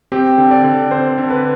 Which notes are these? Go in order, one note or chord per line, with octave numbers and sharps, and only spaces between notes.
C4 G4
D3
D5
D3
C4 C5
D3
B4